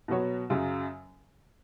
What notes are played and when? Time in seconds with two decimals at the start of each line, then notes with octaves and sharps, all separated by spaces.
0.08 B2 F#3 B3 F#4 C#5
0.50 F#2 C#3 F#3